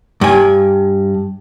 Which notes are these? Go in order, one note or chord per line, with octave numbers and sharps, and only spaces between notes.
G2 G#5